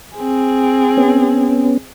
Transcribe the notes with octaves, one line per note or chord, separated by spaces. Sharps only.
C4 G#4
B3 C#4